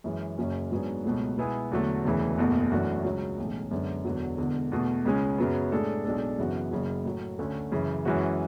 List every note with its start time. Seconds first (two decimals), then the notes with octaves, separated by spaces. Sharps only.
0.04 F#2 E3 G#3
0.38 F#1 F#2 C#3 F#3 C#4
0.71 G#2 F#3 B3 D4 G#4
1.04 C#2 B2 F#3 A3
1.38 B2 G#3 B3 E4 G#4
1.71 E2 D3 F#3 A3
2.05 E1 D2 C#3 E3
2.38 F#1 E2 B2 A3
2.72 F#2 E3 A3 D4 F#4
3.04 C#2 C#3 F#3
3.38 B1 A2 E3 G#3 C#4
3.71 F#2 D3 G#3 B3 D4
4.05 E1 E2 D3 F#3
4.38 E1 E2 D3
4.72 E2 B2 A3
5.05 C#2 C#3 G#3 C#4
5.38 F#2 C#3 F#3 B3
5.72 A2 G#3 D4 A4
6.05 B1 B2 G#3 D4 A4
6.39 F#2 C#3 E3 B3 F#4
6.71 F#1 F#2 C#3 F#3
7.05 A2 F#3 A3
7.38 D2 D3 A3 C#4
7.72 F#2 C#3 E3
8.05 F#2 E3 G#3 C#4 F#4